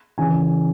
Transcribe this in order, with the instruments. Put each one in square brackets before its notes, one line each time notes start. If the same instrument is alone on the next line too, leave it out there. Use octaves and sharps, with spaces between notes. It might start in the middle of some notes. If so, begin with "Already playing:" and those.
[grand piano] C#3 E3 G#5